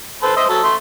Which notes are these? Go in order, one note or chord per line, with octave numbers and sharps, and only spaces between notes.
A4 B4 C5
C5 D#5 E5
F#3 A4
A3 C6